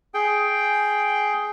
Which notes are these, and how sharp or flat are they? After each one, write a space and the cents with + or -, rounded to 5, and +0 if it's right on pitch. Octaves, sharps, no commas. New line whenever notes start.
G#4 +10 G5 +0